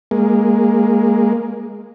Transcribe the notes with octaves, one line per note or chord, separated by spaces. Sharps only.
G#3 A#3